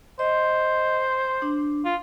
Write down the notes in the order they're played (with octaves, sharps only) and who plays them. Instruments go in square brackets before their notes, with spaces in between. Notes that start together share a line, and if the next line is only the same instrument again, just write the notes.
[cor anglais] C5 [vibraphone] D#5
[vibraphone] D4
[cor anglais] F4